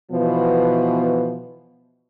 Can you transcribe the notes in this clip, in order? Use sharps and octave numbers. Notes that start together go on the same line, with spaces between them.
B2 E3 F3 B3